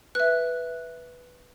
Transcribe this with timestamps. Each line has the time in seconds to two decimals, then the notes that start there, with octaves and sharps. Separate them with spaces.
0.15 B4 E5 F#6